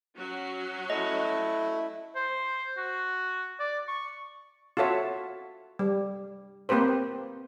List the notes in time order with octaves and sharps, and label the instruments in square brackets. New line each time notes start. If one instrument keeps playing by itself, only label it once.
[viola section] F#3 C#4 F#4
[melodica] A3 [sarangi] E4 [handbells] D#5
[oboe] C5
F#4
D5
C#6
[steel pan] F4 F#4 A4 C#5 E5
G3
A#3 C4 G4 B4 C5